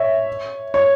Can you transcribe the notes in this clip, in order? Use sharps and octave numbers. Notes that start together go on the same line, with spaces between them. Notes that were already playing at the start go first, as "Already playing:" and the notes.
Already playing: C#5 E5
C#5